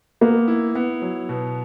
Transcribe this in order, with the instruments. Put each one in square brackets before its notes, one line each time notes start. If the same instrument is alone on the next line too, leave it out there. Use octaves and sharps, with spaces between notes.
[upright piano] A#3 [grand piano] B3
[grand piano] E4
B3
F#3
B2